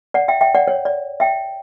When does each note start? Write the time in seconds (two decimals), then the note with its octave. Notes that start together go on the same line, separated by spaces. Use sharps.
0.14 D5 F#5
0.28 E5 G5
0.41 E5 G5
0.55 D5 F#5
0.68 C#5
0.85 D5
1.20 E5 G5